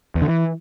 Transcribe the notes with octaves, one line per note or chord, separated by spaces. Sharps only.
E2
D3
E3